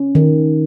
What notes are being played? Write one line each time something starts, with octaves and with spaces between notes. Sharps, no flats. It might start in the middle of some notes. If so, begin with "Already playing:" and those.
Already playing: C#4
D#3